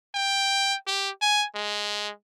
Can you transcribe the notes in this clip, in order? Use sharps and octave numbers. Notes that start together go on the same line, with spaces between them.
G5
G4
G#5
G#3